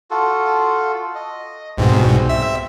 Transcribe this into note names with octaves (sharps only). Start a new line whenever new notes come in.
F4 F#4 A4
D#5
C2 G#2 B2 C4
E5